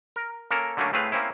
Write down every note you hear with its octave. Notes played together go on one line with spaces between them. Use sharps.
A#4
A#3 C#4 A4 A#4
D3 F#3 A3 A#3 C#4 D4
A2 A3 C4 G#4 B4 F5
A#3 C4 C#4 E4